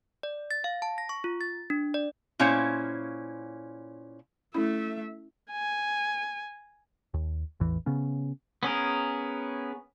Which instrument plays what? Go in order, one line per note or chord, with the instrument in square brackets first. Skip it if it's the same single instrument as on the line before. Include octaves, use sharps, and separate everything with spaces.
[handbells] D5
A6
F5
A5
A#6
C#6
F4
A6
D4
D5
[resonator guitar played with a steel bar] A#2 C#4 E4 C5 C#5 F5
[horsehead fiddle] A3 E5 [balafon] C#4 E4 B5
[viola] G#5
[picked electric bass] D#2
A1 E2 E3
C#3 B3 C#4
[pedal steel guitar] B3 C#4 G#4 A#4